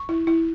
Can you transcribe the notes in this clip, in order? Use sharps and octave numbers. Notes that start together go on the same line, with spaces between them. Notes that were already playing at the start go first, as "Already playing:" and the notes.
Already playing: C#6
E4
E4